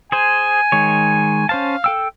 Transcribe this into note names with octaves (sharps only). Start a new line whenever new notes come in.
G#4 C5 G#5
D#3 G#3 C#5
C#4 C5 F5 A5
A4 G5 E6